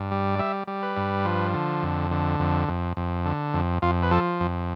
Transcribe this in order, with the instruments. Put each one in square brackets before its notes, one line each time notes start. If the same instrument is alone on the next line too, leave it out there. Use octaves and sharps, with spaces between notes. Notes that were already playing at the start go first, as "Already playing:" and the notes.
Already playing: [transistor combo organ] G2
G3
D5
G3 E5
G3
B4
G2
F3
D3
F2
D3
F2
F2
F2
D3
F2
F2 F4
B4
F3 A4
F2